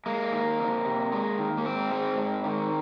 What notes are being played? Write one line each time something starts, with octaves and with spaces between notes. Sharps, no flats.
G#3 A#3
D#3
F2
C3
G#3
D#3
A#3
G#2 C4
G#3
G#2
D#3